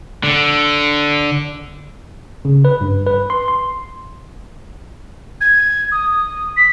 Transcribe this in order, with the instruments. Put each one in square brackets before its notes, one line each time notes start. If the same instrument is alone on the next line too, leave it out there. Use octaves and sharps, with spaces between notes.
[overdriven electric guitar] D3
[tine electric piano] C#3
B4
G2
B4
C6
C6
[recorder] G#6
D#6
B6